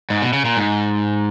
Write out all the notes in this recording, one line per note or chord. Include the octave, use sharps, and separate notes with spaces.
G#2
B2
C#3
A#2
G#2